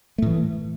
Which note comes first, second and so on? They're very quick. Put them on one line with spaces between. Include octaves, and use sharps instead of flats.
A3 A2 E3